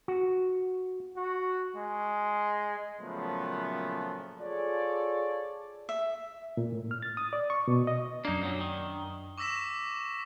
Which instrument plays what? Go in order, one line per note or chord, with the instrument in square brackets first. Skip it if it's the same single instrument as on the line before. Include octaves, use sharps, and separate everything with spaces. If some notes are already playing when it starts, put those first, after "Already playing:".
[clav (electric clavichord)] F#4
[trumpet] F#4
G#3
[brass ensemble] A#2 C#3 F3 F#3 A3 B3
F4 G#4 A4 C#5 D5
[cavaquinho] E5
[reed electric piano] A#2
A2
F6
A6
D#6
D5
C#6
B2
D#5
[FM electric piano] F#2 D4 [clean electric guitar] A#3 D#4
[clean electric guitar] A#2 F#3
D#3
[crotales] C#6 D6 E6 A#6 B6 E7